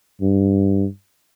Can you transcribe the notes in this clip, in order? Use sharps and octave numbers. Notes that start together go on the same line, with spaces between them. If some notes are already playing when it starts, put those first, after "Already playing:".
G2